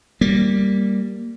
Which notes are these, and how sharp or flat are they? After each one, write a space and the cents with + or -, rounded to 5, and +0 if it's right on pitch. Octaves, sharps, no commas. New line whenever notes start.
G3 +0 A#3 -5